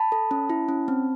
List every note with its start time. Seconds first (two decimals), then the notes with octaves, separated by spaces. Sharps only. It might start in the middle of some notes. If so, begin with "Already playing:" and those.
Already playing: A5 B5
0.12 A4
0.31 C#4
0.50 E4
0.69 C#4
0.88 C4